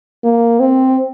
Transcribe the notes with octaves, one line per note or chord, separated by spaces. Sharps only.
A#3
C4